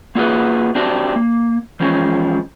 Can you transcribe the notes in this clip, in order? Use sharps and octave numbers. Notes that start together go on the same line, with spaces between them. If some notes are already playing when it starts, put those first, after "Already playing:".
A#3 F4 F#4 G#4 B4
C4 D4 F#4 G4
A#3
E3 F3 G#3 C#4